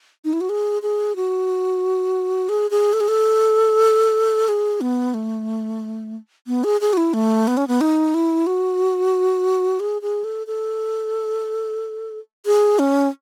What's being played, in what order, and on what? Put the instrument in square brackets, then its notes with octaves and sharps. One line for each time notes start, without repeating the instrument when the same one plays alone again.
[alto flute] D#4
E4
F#4
G#4
G#4
F#4
G#4
G#4
A4
G#4
A4
G#4
B3
A3
B3
G#4
G#4
F#4
E4
A3
B3
C#4
B3
D#4
E4
F#4
G#4
G#4
A4
A4
G#4
C#4